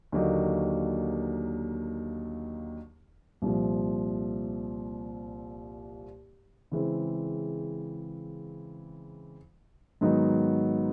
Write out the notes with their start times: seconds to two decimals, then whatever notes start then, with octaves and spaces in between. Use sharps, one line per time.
0.12 D#2 D3 F#3 A#3 D#4
3.42 C2 A#2 F3
6.72 C#3 E3 G#3 C4
10.01 G#2 D#3 F#3 B3 D#4